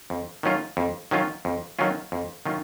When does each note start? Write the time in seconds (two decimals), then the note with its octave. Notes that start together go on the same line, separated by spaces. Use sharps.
0.10 F2
0.43 D#3 F#3 C#4 F4
0.77 F2
1.11 D#3 F#3 C#4 F4
1.45 F2
1.79 D#3 F#3 C#4 F4
2.12 F2
2.46 D#3 F#3 C#4 F4